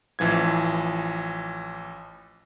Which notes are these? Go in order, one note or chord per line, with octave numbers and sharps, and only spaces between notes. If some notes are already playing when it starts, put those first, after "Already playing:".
A1 E3 F3 G#6